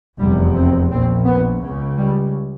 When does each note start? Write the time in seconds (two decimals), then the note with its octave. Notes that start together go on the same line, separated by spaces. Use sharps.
0.19 F1 E2 C3 G3
0.55 C4
0.90 A#1 A#2 C4
1.25 B3
1.61 C#3
1.66 C#2
1.97 G3